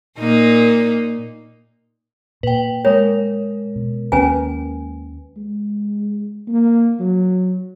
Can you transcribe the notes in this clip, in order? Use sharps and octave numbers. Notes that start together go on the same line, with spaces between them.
A#2 A#3 D#4
A#2 B4 G5
G#3 A#4 C#5
B2
D#2 C#4 B4 G#5
G#3
A#3
F#3